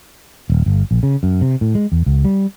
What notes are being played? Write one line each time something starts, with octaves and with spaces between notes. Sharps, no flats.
D#1
G1
A#1
C#3
F#2
C3
A2
G#3
E2
C#2
G3